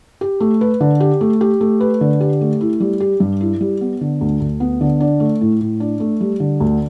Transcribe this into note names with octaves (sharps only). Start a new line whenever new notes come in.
G4
A3
B4
D3
G4
A3
G4
A3
B4
D3
G4
A3
E4
G3
G4
G2
E4
G3
B3
D3
D2
D2
B3
D3
D4
A3
A2
A2
D4
A3
G3
D3
D2